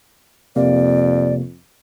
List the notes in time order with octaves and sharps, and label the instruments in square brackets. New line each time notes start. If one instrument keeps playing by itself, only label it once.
[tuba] F2 [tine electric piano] C3 A#3 [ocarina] D5